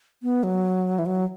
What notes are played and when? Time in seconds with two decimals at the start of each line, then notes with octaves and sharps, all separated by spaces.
0.23 B3
0.43 F#3
0.99 E3
1.06 F#3